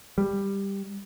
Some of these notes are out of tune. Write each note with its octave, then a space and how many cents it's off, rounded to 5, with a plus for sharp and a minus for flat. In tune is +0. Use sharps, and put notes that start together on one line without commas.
G3 +10